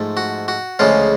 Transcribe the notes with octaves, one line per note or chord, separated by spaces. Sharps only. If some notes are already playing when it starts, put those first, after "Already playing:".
Already playing: G#2 F3 A3
F#4
F#4
D2 C#3 F3 G#3 F4